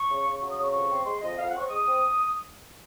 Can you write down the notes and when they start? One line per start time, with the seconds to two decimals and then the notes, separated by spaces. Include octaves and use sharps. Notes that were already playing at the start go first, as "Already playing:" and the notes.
Already playing: C#6
0.09 C#3
0.24 C#3
0.40 F#3 C#6
0.51 D#6
0.57 C#3
0.62 C#6
0.72 F2 C#6
0.88 C4
1.04 G#3 C6
1.20 F2 D#5
1.36 F2 F5
1.47 C4 F#5
1.58 C#6
1.68 G#3 D#6
1.84 C4